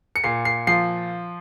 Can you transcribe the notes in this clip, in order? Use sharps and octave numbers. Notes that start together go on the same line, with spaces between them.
C#7
A#2 C7
C7
F3 C7